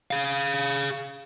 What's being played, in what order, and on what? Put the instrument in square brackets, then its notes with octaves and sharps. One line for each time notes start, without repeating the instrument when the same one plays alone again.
[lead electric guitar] G#4 F5